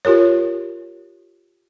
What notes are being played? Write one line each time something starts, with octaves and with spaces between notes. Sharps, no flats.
F4 G4 A#4 C#5